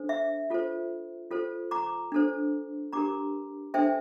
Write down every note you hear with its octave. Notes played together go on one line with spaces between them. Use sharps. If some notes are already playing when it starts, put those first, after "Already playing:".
Already playing: D4 A4 C5
E5
F4 A4 C5
F4 A4 C5
A#5 D6
D4 A4 C5
D4 G4 A#4 A#5 D6
D4 A4 C5 E5 G5